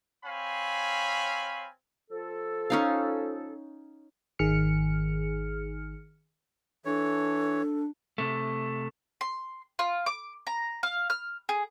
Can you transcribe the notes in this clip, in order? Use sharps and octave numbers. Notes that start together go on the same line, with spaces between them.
C4 C#5 F5 G#5 B5
F3 F4 A4
C#4 D#4 F5
G#1 D#3 G#4 F6 C#7
E3 D4 A4 C#5
C3 A3
C6
F4
D6
A#5
F5
F6
G#4